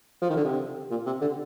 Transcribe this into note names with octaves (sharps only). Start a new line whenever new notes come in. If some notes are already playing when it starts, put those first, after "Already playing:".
F3
D#3
D3
C3
A#2
C3
D3